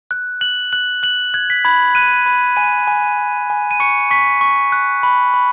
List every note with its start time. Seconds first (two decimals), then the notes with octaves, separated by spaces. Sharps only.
0.11 F#6
0.41 F#6 F#7
0.73 F#6 F#7
1.03 F#6 F#7
1.34 F#6 G#6
1.50 B6
1.65 B5 G#6
1.95 F#6 D#7
2.26 B5
2.56 G#5 D#7
2.87 G#5
3.18 G#5
3.50 G#5
3.71 D#7
3.80 C#6 C#7
4.11 C#6 B6
4.41 C#6
4.72 F#6
5.03 B5
5.34 B5